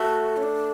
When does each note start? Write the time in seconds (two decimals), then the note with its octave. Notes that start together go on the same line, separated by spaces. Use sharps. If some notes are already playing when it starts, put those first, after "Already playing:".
Already playing: A3 F#4
0.37 C#4
0.43 D4